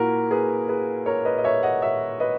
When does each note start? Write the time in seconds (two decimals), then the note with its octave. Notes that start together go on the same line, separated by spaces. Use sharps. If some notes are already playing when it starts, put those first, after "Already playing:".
Already playing: A#2 E4 F#4 A#4
0.31 G#4 B4
0.69 G#4 B4
1.06 A#4 C#5
1.25 B4 D#5
1.38 D#5
1.44 C#5 E5
1.63 D#5 F#5
1.82 C#5 E5
2.20 B4 D#5